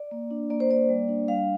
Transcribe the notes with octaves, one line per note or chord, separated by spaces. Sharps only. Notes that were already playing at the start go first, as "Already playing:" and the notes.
Already playing: D5
A#3
D4
A#3 D5
C5
A#3 D5
G3
D4
G3 F5